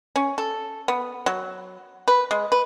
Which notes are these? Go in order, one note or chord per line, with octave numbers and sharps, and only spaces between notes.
C#4
A4
B3
F#3
B4
G#3
B4